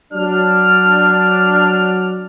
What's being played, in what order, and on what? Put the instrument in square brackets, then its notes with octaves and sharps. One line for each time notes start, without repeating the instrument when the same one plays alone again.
[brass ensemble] F#3 D4 [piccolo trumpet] F6